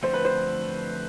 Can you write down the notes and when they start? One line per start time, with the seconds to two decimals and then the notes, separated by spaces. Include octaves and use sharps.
0.03 D3 F3 A3 C4 C5
0.13 B4
0.25 C5